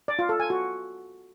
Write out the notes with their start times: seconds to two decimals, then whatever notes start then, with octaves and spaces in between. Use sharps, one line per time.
0.08 D5
0.19 F4
0.29 A4
0.40 G#5
0.50 F#4